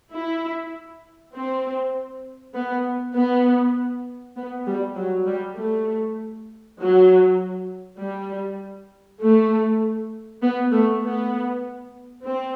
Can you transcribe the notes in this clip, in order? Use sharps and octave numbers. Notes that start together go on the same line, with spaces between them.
E4
C4
B3
B3
B3
G3
F#3
G3
A3
F#3
G3
A3
B3
A3
B3
C4